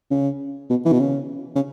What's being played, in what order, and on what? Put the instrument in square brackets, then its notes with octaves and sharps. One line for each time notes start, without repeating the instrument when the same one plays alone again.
[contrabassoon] C#3
B2
E3
B2
C#3
C#3